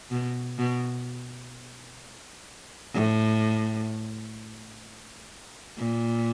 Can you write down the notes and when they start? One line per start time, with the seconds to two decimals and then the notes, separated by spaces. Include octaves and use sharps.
0.11 B2
0.59 B2
2.94 A2
5.78 A#2